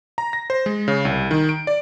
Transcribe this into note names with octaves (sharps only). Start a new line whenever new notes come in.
A#5
A#6
C5
G#3
C#3
C2
D#3
D7
D5